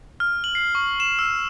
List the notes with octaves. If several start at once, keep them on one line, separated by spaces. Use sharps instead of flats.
F6
F#7
C7
C#6
E7
E6